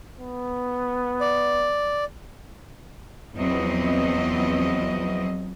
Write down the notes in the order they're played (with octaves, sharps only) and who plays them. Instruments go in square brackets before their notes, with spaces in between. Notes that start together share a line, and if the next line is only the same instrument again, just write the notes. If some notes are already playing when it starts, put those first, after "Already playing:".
[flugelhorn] B3
[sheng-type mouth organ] D5
[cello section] E2 F3 F#3 B3 C4 D#5